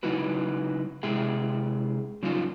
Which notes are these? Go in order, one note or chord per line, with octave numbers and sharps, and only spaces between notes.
C#3 F#3 D#4 E4 F#4 B4
C3 G#3 E4 G#4 E5 G5
C#3 F3 F#3 D#4 F4